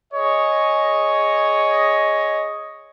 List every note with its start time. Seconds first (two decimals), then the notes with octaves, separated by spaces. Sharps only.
0.13 G#4 C#5 D#5